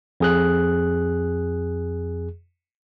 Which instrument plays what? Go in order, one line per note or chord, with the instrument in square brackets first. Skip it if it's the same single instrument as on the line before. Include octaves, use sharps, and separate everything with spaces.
[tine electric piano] F2 G#4 F#6